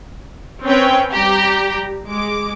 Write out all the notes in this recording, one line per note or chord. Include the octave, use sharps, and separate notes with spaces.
C4 C#4 B4 C#5 G5
G3 G4 A#5
G#3 D6